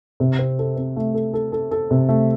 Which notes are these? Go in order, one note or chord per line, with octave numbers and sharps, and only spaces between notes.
C3
C4
A4
C4
A3
A4
A4
A4
A4
C3
A3